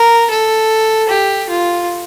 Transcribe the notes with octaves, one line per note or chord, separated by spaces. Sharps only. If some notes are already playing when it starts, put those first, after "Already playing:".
Already playing: A#4
A4
G4
F4